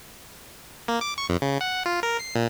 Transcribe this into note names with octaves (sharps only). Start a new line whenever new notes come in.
A#3
D6
C#6
F2
C#3
F#5
F4
A#4
C7
A#2